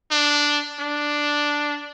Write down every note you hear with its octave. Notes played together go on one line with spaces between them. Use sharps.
D4
D4